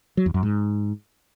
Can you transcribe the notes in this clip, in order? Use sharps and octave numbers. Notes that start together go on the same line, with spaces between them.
F#3
E2
F#2
G#2